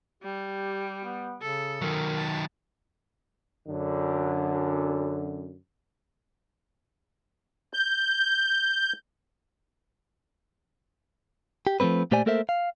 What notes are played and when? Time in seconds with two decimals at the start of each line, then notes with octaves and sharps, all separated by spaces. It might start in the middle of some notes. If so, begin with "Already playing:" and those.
0.23 G3 G4
1.04 B3
1.41 C#3 A4
1.82 D#3 F#3 A#4
2.17 A5
3.68 F#2 D3
7.73 G6
11.67 G4
11.80 F3 F#3 A3 C4 B4
12.11 A#2 A3 G4 C5 D5 G#5
12.26 A3 A#3 A4 A#4 C5 E5
12.49 F5